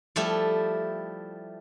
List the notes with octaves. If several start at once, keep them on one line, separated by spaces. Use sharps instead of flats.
F3 G3 A3 E4 G4